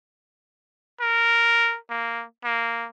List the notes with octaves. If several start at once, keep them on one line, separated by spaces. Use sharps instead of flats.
A#4
A#3
A#3